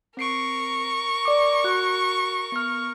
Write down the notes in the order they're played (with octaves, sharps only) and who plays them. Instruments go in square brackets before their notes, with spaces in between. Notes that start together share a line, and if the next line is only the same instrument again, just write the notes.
[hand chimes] C4 C7 D7 [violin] A#4 C#6
[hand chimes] D5 D6
F#4 F#6
B3 F6